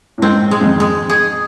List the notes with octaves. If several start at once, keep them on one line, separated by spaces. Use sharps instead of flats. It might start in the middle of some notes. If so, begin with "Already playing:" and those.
A2
G#2 C4
G#3
G#2
F2
G#3
G#4